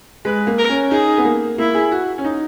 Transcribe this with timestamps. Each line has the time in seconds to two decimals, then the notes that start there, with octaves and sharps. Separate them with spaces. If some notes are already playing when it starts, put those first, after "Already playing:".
0.25 G#3 B4
0.47 A#3
0.58 A#4
0.69 C#4
0.91 D#4 G#4
1.18 B3
1.25 A#3
1.58 A#3 E4
1.74 G#4
1.91 F#4
2.18 C#4
2.24 D#4